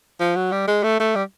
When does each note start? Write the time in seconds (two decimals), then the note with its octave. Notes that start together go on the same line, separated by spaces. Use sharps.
0.20 F3
0.36 F#3
0.52 G3
0.68 G#3
0.83 A3
1.00 A3
1.15 G3